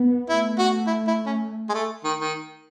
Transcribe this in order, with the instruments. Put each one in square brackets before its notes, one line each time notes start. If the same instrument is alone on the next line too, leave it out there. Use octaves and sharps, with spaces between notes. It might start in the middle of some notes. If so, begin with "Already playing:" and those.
Already playing: [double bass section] B3
[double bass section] A3 [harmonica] E4
[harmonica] F#4
E4
E4
C#4
G#3
A3
D#3
D#3